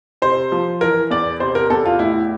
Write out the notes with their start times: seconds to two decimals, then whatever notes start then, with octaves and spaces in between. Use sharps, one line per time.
0.22 C3 C5
0.52 F3
0.81 E3 A#4
1.11 E2 D5
1.40 C3 C5
1.55 A#4
1.70 E2 A4
1.86 F4
1.99 A2 E4